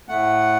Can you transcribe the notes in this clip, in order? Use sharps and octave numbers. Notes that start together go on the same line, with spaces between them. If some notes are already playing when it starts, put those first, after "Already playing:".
A2 A3 F#5